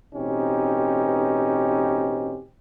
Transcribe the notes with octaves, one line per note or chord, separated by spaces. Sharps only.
A1 B2 C4 C#4 D#4 G4